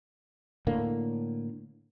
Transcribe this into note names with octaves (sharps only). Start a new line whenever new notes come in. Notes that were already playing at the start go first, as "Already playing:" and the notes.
A2 D3 A#3